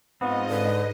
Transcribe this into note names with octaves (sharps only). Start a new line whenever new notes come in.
G#2 B3 C4 D#4 F4 D#5
D3 B4